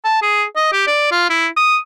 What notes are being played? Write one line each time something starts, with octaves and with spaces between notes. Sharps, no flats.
A5
G#4
D#5
G4
D5
F4
E4
D#6